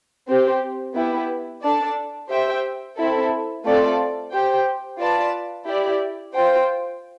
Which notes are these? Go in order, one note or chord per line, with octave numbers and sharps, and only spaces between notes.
C4 G4 C5
B3 E4 G4 B4
D4 A4 D5 A5
G4 C5 E5 G5
C4 E4 A4
A3 C4 F4 A4 D5
G4 C5 G5
F4 B4 D5 A5
E4 G4 D5
F4 C5 G5